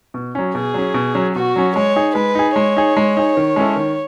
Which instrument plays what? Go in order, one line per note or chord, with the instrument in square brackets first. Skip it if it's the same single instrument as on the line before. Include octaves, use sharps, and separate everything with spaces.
[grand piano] B2
F#3 C#4
[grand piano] B2 [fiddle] G#4
[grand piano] F#3 C#4
B2
F#3 C#4
[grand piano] B2 [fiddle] F#4
[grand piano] F#3 C#4
[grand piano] G#3 [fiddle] C#5
[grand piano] D#4 G#4
[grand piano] G#3 [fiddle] B4
[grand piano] D#4 G#4
[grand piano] G#3 [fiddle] C#5
[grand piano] D#4 G#4
G#3
D#4 G#4
D#3
G#3 C#4 E4 A4
D#3